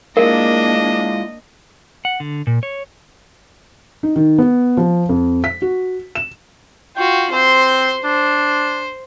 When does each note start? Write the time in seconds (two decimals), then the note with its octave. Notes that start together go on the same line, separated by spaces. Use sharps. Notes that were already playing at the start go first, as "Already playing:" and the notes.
0.17 G#3 A#3 D4 E4 F4 A#4 D#5
2.05 F#5
2.20 D3
2.47 A#2
2.63 C#5
4.03 D#4
4.16 D#3
4.38 B3
4.77 F3
5.09 F2
5.44 B6
5.62 F#4
6.15 E7
6.96 F4 F#4 G5
7.32 C4 C5 C6
8.04 D4 C5